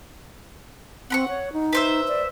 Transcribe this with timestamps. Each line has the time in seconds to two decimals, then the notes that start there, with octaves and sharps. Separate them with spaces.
1.10 C4 F#5 B5 C#6
1.29 C#5
1.53 D#4
1.73 B4 C5 E5
2.08 D5